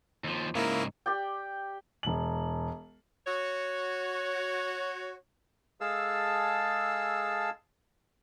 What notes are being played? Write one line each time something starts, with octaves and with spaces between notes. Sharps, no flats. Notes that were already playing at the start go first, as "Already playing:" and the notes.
D#2 F3
G#2 C#3 A#3 E4 A#4
G4 D5 G5
E1 F#7
F#4 C#5
G#3 G#4 A4 F5 A5 E6